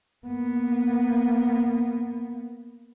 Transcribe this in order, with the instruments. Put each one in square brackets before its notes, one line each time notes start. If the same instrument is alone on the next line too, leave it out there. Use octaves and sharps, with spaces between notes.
[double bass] A#3 B3